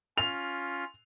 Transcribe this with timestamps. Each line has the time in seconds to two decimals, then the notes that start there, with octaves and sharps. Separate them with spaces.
0.18 C#4 F4 F7